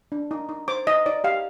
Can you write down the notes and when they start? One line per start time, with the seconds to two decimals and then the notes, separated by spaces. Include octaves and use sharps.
0.12 D4
0.31 D#4
0.49 D#4
0.68 C5 D6
0.87 D#4 D#5
1.06 D#4 D5
1.24 G4 F5